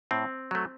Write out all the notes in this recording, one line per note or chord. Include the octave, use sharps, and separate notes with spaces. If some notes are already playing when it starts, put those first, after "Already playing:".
A2 C4
F#3 A3